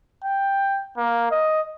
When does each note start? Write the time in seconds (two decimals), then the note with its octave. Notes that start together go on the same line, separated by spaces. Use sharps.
0.24 G5
0.97 A#3
1.31 D#5